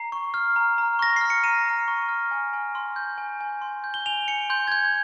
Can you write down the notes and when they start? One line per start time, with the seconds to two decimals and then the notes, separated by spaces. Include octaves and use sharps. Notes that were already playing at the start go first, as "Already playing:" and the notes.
Already playing: A#5 C7
0.12 C#6
0.34 F6
0.56 A#5
0.78 A#5
0.99 C#6 A#6
1.16 F6 C7
1.30 C#7
1.44 A#5 D#7
1.66 A#5
1.88 C#6
2.08 F6
2.31 G#5
2.53 G#5
2.75 C6
2.96 G6
3.18 G#5
3.41 G#5
3.62 C6
3.84 G6
3.94 G7
4.06 G#5 F7
4.28 G#5 C#7
4.50 C6 G6
4.68 G#6
4.72 G6